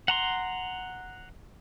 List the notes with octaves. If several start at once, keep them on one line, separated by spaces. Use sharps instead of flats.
F#5 A#5 C6